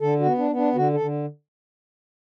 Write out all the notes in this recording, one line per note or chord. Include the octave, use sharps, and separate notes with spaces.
D3 A4
F#4
B3
D4
B3
D4
D3 F#4
A4
D3